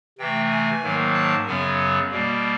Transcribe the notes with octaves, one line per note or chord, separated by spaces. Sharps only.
C3 E3 A3 G5
G#5
G#2 D#3 F#3 A#3
A5
F#2 C#3 F#3 B3 G#5
B2 G3 A#3